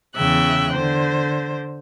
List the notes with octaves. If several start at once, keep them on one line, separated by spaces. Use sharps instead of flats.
E2 C#3 E5 G5 F#6
D3 C5